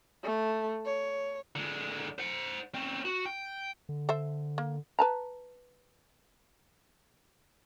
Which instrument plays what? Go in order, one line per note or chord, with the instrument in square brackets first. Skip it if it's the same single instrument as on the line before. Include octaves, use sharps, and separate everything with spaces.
[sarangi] A3
C#5
[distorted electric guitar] D3 G#3
C5 F#5
C4 C#4
F#4
G5
[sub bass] D3
[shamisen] A4 C5 E5
A#3
B4 A5 A#5